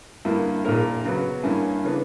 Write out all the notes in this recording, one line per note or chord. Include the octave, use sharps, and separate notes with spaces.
G2 D3 A#3 E4
A#1 A#2 A#3 E4 A#4
C#3 F#3 B3
G2 D3 A#3 C#4 E4
C#3 E3 B3 D4